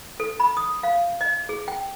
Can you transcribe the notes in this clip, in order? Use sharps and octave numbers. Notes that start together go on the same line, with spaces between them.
A4
B5
D#6
F5
D#5
G#4
G5